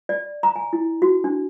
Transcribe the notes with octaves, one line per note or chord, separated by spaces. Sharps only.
D5
A#5
G#5
E4
F#4
D4